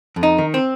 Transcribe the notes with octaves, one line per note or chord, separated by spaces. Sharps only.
F2
D#4
D#3
C4